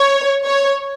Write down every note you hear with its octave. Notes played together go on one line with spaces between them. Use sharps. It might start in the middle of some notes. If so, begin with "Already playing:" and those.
Already playing: C#5
C#5